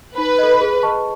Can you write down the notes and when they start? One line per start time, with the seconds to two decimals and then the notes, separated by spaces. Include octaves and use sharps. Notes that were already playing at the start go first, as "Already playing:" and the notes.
0.17 D#4 B4
0.39 A4 D#5
0.61 G#4
0.83 B4 D#5 A5 C#6